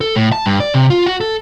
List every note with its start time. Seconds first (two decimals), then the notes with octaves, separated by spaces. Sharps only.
0.01 A4
0.16 A2
0.32 A5
0.46 G2
0.60 D5
0.74 C3
0.90 F4
1.06 F#4
1.21 A4